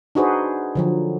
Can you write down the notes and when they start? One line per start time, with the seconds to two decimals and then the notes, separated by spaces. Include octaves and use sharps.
0.15 D4 D#4 F#4 G#4 B4 C5
0.75 D3 F3 F#3